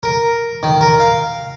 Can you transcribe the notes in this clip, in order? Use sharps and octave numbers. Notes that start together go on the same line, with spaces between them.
A#4
D#3
A#4
F5